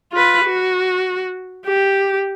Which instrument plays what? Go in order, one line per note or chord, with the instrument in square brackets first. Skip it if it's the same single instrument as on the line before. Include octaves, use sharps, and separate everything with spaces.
[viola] F4 B4
F#4
G4